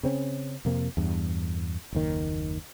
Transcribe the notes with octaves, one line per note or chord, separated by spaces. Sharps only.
C#3 C4 C#4
F2 C3 A#3
E2 G2
F#1 D#2 D#3